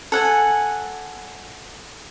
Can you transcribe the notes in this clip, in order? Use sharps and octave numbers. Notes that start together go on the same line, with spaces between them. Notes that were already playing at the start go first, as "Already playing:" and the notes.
A4 F#5 G#5